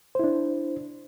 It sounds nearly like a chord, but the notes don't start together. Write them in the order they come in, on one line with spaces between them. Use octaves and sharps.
C5 E4 D4